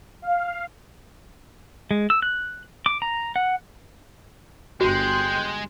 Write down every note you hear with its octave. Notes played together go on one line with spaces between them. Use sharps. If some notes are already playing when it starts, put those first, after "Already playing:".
F5
G#3
E6
F#6
D6
A#5
F#5
G1 G#3 F#4 G5 C6 F#6